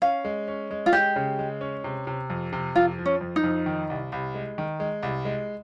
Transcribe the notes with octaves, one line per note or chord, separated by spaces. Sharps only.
C#4 F5
G#3
C#4
G#3
F4
G#3 G4
C#3
G#3
C#4
C3
C3
F2
C3
F2 F4
F3
C#4
F2
D#4
F2
D#3
C2
C2
G#3
D#3
G#3
C2
G#3